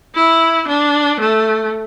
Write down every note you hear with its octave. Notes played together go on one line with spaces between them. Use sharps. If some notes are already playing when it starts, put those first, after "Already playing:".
E4
D4
A3